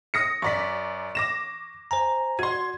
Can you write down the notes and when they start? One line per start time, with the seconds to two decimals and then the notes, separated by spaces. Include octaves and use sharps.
0.14 D#6 A#6 C#7
0.42 F#2 D5 C#6 B6
1.15 D6 A#6 E7
1.91 C5 G#5 A#5
2.39 F#4 D5 C6 G#6